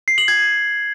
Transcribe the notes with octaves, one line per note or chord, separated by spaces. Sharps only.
C7
F#7
G#6